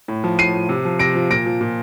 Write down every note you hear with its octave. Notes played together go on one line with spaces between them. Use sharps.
A2
F3
A2 C7 D#7
F3
C3
F3
C3 A#6 D7
F3
A#2 A#6 D7
F3
A#2